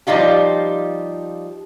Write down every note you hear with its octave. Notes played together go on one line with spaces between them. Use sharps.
F3 G3 D#4 F4 G4